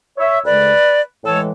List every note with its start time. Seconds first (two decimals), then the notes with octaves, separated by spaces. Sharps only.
0.18 C#5 E5
0.45 D2 C#3 G#3 B4 D5
1.24 A2 E3 G#3 A4 C#5